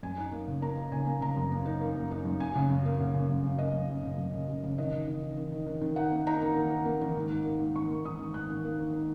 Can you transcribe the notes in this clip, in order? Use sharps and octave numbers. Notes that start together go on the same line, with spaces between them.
F#2 G#5
D#4
A#3
C#3
A#3 A#5
D#4
C#3 G#5
A#3
C#3 A#5
F#2
A#3
D#4
A#3
F#2
D#4
F#2
F#2 G#5
C#3
F#2
A#3
C#3
C#3
F#2
F#2
A#3 D#5
F#2
F#2
C#3
F#2
C#3
F#2
C#3
D#3 D#5
D#3
D#3
D#3
D#3
D#3
D#3
D#3
D#4 F#5
A#3
D#4 A#5
A#3
D#3
D#4
A#3
D#3
G#2
D#4
A#3
G#2
D#3 C#6
A#3
D#3 D#6
D#3
G#2 F#6
D#3
A#3
D#3
D#4